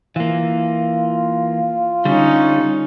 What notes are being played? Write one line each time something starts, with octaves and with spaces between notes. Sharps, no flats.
E3 A#3 F4
D3 G3 C#4 D#4